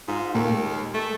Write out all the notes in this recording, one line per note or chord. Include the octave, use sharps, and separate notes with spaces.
G#2 F4
D#2 A#2 A3 A#3
G#3
A3